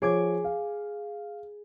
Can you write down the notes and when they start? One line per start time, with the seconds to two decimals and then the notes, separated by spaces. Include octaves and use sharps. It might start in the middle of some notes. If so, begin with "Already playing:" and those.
0.02 F3 G#4 C#5 D6 G#6
0.44 F5